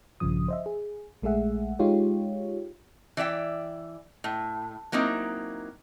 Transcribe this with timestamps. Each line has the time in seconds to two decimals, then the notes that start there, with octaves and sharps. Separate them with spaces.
0.20 A#1 G2 C#3 F3 D#6
0.48 C5 D#5 E5
0.66 G#4
1.22 A#1 G#3 A3 G#4 E5 F#5
1.79 G#3 D#4 F4 G4 C#5
3.17 E3 D5 E5 G5
4.24 A2
4.92 F#3 A#3 C4 D#4 E4